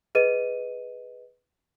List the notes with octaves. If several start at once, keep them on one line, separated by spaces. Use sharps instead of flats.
G#4 B4 D#5 D#7